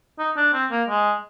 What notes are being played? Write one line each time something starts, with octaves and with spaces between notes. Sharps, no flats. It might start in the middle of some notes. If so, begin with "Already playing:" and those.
D#4
D4
C4
A#3
G#3